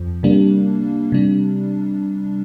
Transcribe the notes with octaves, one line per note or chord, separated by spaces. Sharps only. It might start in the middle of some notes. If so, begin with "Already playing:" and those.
Already playing: F2 F3
C3 G3 A#3 D4
C3 G3 D4